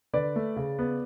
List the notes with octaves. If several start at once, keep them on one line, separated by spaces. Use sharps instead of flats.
D3 B4 D5
A3
C#3
B3